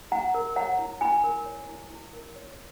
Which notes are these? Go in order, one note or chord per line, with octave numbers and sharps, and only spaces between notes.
E4 F#5 A#5
A#4
C#5 F#5 A#5
E4
E4 G#5 B5
A#4
C#5
E4
E4
A#4
C#5